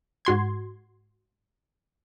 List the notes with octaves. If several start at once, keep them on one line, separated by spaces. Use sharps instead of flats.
G#2 F#4 C6 G#6